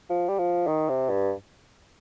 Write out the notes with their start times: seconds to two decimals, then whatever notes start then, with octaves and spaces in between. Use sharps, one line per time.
0.10 F3
0.28 G3
0.39 F3
0.67 D#3
0.89 C3
1.10 G2